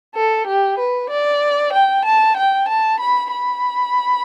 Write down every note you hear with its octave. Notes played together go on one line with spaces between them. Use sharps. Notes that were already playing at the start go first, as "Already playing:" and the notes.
A4
G4
B4
D5
G5
A5
G5
A5
B5
B5